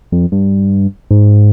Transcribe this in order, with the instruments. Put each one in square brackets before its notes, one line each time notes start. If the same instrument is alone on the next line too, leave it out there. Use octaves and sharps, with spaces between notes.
[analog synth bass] F2
G2
G#2